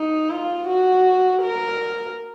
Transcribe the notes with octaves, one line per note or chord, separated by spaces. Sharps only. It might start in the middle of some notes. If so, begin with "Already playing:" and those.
Already playing: D#4
F4
F#4
A#4